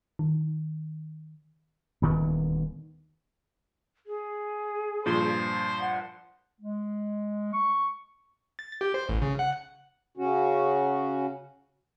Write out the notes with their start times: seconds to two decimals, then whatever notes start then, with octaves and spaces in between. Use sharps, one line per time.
0.19 D#3
2.02 D#1 D2 D#3 B3
4.06 G#4
5.06 G2 A#2 F3 C5
5.80 F#5
6.61 G#3
7.53 C#6
8.59 A6
8.81 G4
8.94 C5
9.09 A1
9.22 C#3
9.39 F#5
10.17 C#3 C#4 F#4